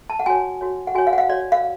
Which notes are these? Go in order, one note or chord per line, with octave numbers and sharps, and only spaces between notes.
A5
F#5
F#4 C#5 G#5
F#4 C#5
F#5
F#4 C#5 G#5
F5
F#5
F5
F#4 C#5 D5
F5